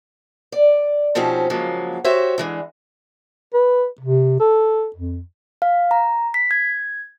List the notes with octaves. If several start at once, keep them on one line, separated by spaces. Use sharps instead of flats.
D5
B2 F3 C4 C#4 D#4 G4
C#3 F3 F#3 G#3 A#3
F#4 G4 C5 C#5 E5
D3 E3 G#3
B4
C3
A4
F2
F5
A#5
B6
G#6